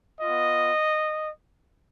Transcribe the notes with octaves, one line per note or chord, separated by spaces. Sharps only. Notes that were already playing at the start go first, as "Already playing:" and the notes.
B3 F4 D#5